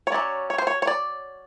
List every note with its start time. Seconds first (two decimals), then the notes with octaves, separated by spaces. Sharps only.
0.07 C#5
0.12 F#3 A3 C#4 D5
0.50 C#5
0.58 C5
0.67 C#5
0.82 C#5
0.87 D5